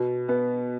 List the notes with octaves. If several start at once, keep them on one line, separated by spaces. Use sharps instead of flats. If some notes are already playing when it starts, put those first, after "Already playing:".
Already playing: B2
B3